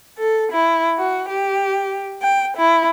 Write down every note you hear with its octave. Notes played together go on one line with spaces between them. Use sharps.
A4
E4
F#4
G4
G5
E4